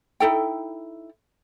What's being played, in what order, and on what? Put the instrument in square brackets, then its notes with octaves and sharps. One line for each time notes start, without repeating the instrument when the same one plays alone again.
[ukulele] D#4 E4 A4 G5